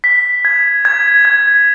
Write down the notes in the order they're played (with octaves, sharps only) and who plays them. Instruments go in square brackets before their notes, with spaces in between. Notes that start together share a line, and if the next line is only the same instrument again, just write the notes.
[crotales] B6
G#6
G#6
G#6